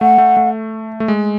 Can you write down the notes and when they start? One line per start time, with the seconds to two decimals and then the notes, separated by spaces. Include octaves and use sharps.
0.01 A3 F#5
0.18 A3
0.37 A3
1.00 A3
1.08 G#3